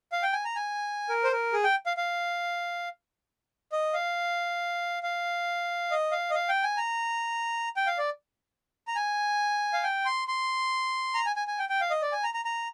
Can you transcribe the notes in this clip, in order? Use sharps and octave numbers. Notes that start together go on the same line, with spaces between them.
F5
G5
G#5
A#5
G#5
A#4
C5
A#4
G#4
G5
F5
F5
D#5
F5
F5
D#5
F5
D#5
F5
G5
G#5
A#5
G5
F5
D5
A#5
G#5
F5
G5
C6
C6
A#5
G#5
G#5
G#5
G5
G5
F5
D#5
D5
G#5
A#5
A#5
A#5